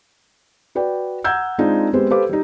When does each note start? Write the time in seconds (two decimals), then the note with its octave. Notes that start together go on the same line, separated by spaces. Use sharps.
0.75 F#4 B4 D5 G5
1.24 F#5 A#5 E6 G6 G#6
1.58 G#3 C4 D4 D#4 F4
1.93 G#3 B3 C4 G4 B4 C5
2.10 G4 A4 B4 C5 F5 D6
2.29 G3 D#4